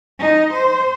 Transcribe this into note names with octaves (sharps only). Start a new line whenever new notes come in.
D#4
C5